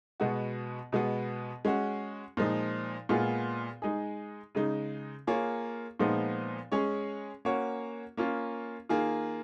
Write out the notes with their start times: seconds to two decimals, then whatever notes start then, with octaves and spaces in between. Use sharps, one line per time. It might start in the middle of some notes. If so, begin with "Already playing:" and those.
0.20 B2 G#3 B3 F#4
0.92 B2 G#3 B3
1.65 G#3 C#4 F#4
2.37 A#2 F3 G#3 D#4
3.09 A#2 G#3 B3 F4 G#4
3.82 G#3 D#4 G#4
4.55 C#3 G#3 D#4
5.27 A#3 F4 G#4 C#5
6.00 A#2 F3 G#3 B3 D#4
6.72 G#3 C#4 G#4 C#5
7.45 A#3 C#4 F#4 C#5
8.17 A#3 C#4 F4
8.89 D#3 A#3 F4 G#4